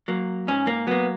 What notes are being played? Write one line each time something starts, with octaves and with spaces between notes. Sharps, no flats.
F#3 A#3
G#2 C#4
A#3
F#3 A#3 B3